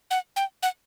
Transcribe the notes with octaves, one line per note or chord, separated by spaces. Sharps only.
F#5
G5
F#5